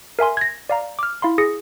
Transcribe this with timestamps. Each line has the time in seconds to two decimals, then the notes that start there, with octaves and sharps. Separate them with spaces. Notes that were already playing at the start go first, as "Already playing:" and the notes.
0.19 A#4 E5 G#5 C6
0.37 G#6 A#6
0.70 D5 F5 A#5
0.99 D6 F6
1.22 E4 F5 B5 C6
1.38 G#4 D#6 A#6 C#7